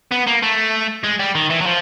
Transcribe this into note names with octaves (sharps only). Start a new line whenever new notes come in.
B3
A#3
A3
G#3
G3
D#3
E3
F#3
F3